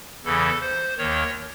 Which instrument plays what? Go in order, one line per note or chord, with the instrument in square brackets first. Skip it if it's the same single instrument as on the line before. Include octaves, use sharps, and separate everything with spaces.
[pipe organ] E2 C#3 E3 A4
C5
D#2 D#3 C#5